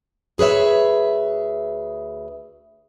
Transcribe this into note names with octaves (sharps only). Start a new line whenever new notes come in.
D2 G#4 B4 C#5 E5